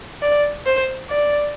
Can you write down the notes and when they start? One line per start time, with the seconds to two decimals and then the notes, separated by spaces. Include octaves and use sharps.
0.22 D5
0.66 C5
1.10 D5